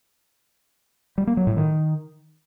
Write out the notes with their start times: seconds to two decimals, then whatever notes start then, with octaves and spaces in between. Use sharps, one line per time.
1.18 G3
1.27 A#3
1.37 F#3
1.47 A2
1.57 D#3